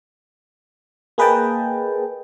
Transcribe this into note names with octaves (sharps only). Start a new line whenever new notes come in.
A#3 G#4 B4 D#5 G5 A5